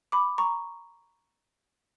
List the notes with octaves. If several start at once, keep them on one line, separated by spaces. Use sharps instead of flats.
B5 D6
A#5 C#6